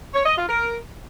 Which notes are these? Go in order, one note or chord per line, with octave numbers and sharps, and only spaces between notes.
C#5
D#5
F4
A#4